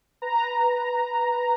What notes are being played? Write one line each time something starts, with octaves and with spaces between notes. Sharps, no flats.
B4 A#5